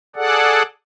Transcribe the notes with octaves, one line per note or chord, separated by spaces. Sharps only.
G#4 A4 D5 F#5